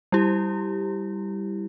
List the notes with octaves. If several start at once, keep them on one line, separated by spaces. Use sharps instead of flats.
G3 E4 G4